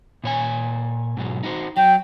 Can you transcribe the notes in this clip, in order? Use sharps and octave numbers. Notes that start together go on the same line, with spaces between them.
A#2 C#5 G#5
G#2 B2 F#3
D#4 F#4 C5
F#3 G5